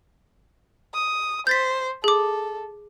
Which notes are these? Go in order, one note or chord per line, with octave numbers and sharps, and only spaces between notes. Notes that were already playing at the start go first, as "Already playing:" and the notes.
D#6
C5 G6 A6 B6
G#4 A4 D6